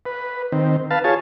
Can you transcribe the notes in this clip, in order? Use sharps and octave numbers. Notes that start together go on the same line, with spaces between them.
B4
D#3 C4
B4 F5 A5
F4 G#4 C#5 A5